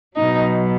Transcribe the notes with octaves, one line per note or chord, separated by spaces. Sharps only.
B2 F#3 D#4